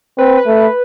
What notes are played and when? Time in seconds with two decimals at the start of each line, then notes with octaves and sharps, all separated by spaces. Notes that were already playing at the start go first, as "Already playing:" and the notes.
0.18 C4 B4
0.37 B4
0.47 A3
0.57 B4